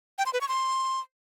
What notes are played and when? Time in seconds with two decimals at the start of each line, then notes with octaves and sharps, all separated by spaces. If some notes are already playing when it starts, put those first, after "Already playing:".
0.18 G5
0.26 C6
0.33 B4
0.41 C#6
0.48 C6